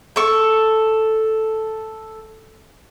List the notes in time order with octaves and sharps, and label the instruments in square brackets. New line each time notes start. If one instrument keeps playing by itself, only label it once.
[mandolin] A4 C#6